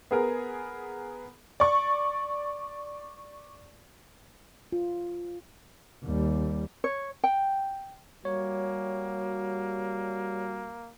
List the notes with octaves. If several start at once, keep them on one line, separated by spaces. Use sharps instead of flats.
B3 G#4 A#4
D5 C#6
F4
D#2 G3
C#5
G5
G3 A#3 F#4 C#5